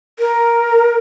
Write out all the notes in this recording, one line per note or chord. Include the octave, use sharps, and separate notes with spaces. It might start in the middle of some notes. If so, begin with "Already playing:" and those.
A#4